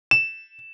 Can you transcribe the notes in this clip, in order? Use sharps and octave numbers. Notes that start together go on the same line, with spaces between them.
E7